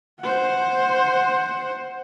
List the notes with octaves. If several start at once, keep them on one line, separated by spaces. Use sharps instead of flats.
C5 F#5